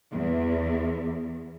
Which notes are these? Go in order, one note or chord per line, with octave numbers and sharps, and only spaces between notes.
E2